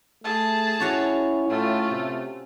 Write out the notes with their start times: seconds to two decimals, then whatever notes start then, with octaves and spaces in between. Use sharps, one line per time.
0.24 A3 G#4 A5
0.80 C#4 E4 F#4 C#5
1.49 A2 A3 F4
1.90 C3